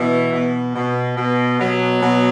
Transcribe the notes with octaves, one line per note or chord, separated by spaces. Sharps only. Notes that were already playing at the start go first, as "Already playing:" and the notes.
Already playing: B2 E3
B2
B2
B2
B2 F#3
B2